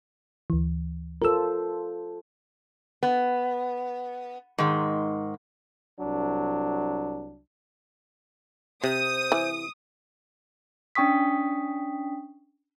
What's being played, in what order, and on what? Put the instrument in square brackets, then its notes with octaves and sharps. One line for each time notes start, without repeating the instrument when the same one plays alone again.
[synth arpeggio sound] D2 E3
[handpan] F4 A4 C5 [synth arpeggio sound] A#4 E6
[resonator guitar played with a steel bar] B3
G#2 D#3 G#3
[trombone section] C2 F#3 D4
[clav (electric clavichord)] C3 [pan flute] C5 [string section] D#6
[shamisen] E3
[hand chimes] C#4 D4 G5 C#6 D#6 B6